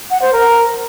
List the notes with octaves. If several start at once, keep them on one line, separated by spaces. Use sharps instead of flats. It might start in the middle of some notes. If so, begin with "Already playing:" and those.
F#5
C5
A#4